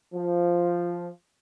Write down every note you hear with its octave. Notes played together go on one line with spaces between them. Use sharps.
F3